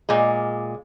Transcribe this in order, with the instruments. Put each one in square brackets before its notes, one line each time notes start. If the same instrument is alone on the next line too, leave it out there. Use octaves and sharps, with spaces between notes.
[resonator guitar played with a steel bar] A#2 G#3